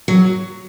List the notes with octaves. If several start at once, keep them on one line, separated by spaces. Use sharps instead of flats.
F#3